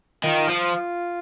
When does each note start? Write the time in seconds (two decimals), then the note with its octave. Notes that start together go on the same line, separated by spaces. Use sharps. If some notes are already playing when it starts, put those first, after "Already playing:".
0.24 D#3 F4
0.49 F3